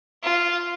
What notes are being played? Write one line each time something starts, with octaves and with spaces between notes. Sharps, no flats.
F4